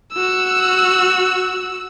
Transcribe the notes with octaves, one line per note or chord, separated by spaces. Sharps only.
F#4 E6